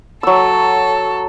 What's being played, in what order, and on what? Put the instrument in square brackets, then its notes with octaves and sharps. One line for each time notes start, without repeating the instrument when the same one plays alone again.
[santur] F#3 E6 [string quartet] A4